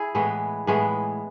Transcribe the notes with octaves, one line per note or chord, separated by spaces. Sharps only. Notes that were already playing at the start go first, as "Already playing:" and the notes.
Already playing: E4 G#4
A2 E3 G#3 B3
A2 E3 G#3 B3